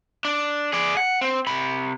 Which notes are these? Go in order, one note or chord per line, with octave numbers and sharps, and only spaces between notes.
D4
G#4 D5
F#5
C4
C3 B5